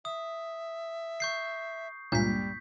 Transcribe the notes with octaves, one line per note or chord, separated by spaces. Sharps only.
E5 D#6
C#6 G6 C7
C#2 G2 A#2 G3 G6 B6